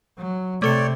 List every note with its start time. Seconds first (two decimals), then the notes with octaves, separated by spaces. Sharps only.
0.17 F#3
0.62 C3 A3 A4 C#5 D5 C#7